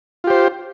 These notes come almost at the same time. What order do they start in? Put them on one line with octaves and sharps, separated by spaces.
F4 G4 C5